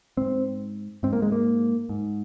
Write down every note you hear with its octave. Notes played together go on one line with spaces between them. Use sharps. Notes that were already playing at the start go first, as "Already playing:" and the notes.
G#2 C4
G#2 C4
A#3
G#3
A#3
G#2